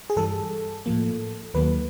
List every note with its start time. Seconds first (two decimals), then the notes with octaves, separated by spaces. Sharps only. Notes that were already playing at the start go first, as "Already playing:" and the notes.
0.10 G#4
0.16 G2 E3 G3 A4
0.86 A2 F3 A#3
1.54 D#2 D#3 F#3 A#3 B4